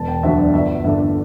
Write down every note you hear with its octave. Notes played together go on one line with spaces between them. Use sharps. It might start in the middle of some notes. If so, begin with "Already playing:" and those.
Already playing: E1 A5
G5
D2 D3 F#3 E5
D5
G1 E5
G2 D3 A3 D4 E5